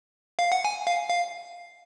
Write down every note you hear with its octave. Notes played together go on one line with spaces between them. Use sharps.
F5
F#5
G#5
F5
F5